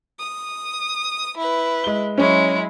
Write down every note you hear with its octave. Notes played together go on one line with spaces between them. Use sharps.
D#6
E4 B4
G#3 G7
F#3 G#3 C#4 E4